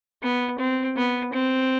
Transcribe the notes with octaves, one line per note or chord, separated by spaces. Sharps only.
B3
C4
B3
C4